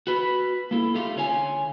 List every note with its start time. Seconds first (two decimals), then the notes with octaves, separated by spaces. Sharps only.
0.07 F#4 B4
0.71 A#3 E4 A4
0.95 A3 D#4 F4 G4
1.16 D3 F4 C#5 F5 G#5